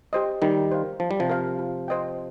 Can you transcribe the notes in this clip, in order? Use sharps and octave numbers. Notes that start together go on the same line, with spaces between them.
G4 C5 D#5
D#3 G3 D#4
C5 F5
F3 F4
G3
C3 F3
A#4 F5
F4
C5 D#5 G5